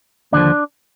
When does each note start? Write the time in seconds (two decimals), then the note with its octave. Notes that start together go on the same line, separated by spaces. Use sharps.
0.32 D#2 D3 F3 D4